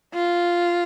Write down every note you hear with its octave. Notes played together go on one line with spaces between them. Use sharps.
F4